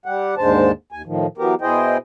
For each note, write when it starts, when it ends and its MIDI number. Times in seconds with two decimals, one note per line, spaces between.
0.06 0.35 55
0.06 0.35 67
0.06 0.35 78
0.38 0.72 39
0.38 0.72 44
0.38 0.72 50
0.38 0.72 56
0.38 0.72 72
0.38 0.72 81
0.92 1.02 39
0.92 1.02 80
1.06 1.27 45
1.06 1.27 51
1.06 1.27 53
1.38 1.55 52
1.38 1.55 54
1.38 1.55 59
1.38 1.55 67
1.38 1.55 70
1.61 1.97 47
1.61 1.97 64
1.61 1.97 68
1.61 1.97 72
1.61 1.97 75
1.61 1.97 79